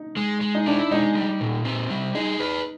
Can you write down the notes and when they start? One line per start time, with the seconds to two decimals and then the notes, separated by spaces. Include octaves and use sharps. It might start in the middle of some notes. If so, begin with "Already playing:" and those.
Already playing: D#4
0.17 G#3
0.41 G#3
0.55 D#4
0.66 D4 E4
0.91 G#3 D#4
1.15 G3
1.40 A#2
1.65 C4
1.90 G3
2.15 D#4 G#4
2.40 B4